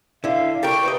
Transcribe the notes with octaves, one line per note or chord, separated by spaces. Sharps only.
D3 E4 E5 F5
G4 A4 A#4 G5 C#6
B4 C5 D#5